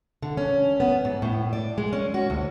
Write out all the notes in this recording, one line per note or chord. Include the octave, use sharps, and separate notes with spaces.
D3
C#4
B3
G#2
A2
D5
G#3
C#4
F#4
D2